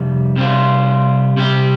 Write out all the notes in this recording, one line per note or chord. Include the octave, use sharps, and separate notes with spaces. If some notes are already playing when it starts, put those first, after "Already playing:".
Already playing: F2 C3 G3
C3 G3 C4 F4
C3 G3 C4 G4